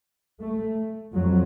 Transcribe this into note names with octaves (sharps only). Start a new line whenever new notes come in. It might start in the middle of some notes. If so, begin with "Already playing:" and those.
A3
F2 F#3